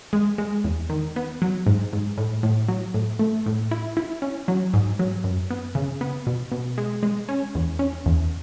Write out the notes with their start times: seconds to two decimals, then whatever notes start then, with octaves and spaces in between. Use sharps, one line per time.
0.13 G#3
0.38 G#3
0.64 E2
0.90 D#3
1.16 B3
1.42 F#3
1.66 G#2
1.93 G#2
2.18 A2
2.43 A2
2.69 F#3
2.94 A2
3.19 A3
3.46 A2
3.71 E4
3.97 E4
4.22 C#4
4.48 F#3
4.74 G#2
4.99 F#3
5.24 F#2
5.51 B3
5.75 C#3
6.01 B3
6.27 B2
6.52 B2
6.78 G#3
7.03 G#3
7.29 C#4
7.55 E2
7.79 C#4
8.06 E2